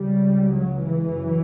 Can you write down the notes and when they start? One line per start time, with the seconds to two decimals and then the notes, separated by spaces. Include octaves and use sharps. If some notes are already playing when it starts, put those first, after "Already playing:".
Already playing: C#2 C#3 G3
0.51 F#3
0.82 E3
1.13 F#2